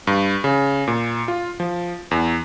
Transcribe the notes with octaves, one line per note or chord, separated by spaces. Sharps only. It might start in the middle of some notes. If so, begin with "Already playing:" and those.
G2
C#3
A#2
F4
F3
E2